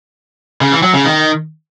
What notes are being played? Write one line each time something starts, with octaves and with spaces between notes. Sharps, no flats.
C#3
E3
F#3
C#3
D#3